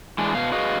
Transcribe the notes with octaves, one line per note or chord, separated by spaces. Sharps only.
E3 G#3 D4
B2 F5
F#4 G#4 B4 D#5 F5